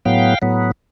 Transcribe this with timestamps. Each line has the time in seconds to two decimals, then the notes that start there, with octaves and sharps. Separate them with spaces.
0.05 A2 F#3 B3 F5 G5
0.42 A2 F#3 B3